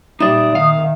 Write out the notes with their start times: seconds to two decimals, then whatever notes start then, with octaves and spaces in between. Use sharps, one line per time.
0.20 A#2 G3 D#4 D5 E5 D#6
0.55 D#3 F5